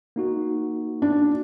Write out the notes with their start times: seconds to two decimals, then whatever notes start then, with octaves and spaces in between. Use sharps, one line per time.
0.16 A#3 D#4 F#4
1.02 D4